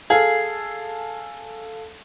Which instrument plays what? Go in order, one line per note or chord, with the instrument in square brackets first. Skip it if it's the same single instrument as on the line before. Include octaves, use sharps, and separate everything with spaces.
[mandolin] G#4 [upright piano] A4 F5